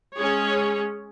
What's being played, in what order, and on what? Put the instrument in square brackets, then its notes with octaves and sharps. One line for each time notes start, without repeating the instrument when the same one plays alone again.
[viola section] G#3 C#4 G#4 C#5